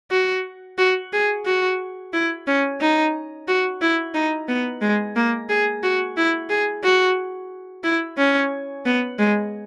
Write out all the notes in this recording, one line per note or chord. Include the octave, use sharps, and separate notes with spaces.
F#4
F#4
G#4
F#4
E4
C#4
D#4
F#4
E4
D#4
B3
G#3
A#3
G#4
F#4
E4
G#4
F#4
E4
C#4
B3
G#3